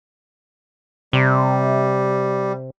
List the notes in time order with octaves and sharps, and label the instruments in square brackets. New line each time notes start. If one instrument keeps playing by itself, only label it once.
[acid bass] C3 [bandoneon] G3